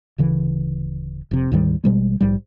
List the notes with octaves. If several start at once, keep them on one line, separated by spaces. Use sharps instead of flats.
D1 C#3 E3
F1 C3
D2 G#2 D#3 G3
A1 B2 G3 G#3
A#1 G#2 G3